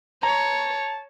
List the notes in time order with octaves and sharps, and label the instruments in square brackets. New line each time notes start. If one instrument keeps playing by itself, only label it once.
[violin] C#5 [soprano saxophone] A5 [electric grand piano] A#5